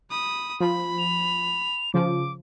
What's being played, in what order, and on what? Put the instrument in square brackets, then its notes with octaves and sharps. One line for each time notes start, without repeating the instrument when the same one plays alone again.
[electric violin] B5 D#6
[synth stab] F3 [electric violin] B5
[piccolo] F7
[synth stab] C#3 F3 [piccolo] D6